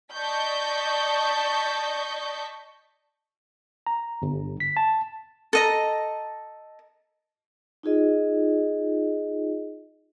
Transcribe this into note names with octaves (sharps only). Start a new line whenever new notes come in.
D5 D#5 A5 C#6 G6 B6
A#5
G1
B6
A5
A4 D#5 A#5
D#4 F4 G#4 D#5